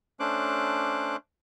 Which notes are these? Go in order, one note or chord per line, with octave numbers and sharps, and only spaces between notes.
A3 C#4 D4 C5 D6 F#6